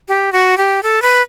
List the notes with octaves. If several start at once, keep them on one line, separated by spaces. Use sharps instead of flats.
G4
F#4
G4
A4
B4